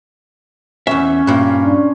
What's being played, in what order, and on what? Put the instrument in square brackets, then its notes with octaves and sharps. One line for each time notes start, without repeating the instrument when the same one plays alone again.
[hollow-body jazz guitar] E2 E5 [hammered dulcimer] C#4
[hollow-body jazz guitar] G2 A#2
[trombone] D4